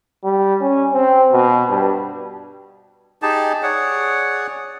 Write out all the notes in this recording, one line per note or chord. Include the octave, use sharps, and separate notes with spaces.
G3
C#4
C4
B2
G2
D#4 G4 G#4 A5
G#4 C#5 D5 F#5